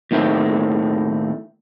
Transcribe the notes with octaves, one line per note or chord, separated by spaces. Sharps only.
D#2 A2 D#3 A3 C4